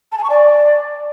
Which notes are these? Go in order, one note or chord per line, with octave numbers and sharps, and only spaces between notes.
A5
G#5
C#6
D5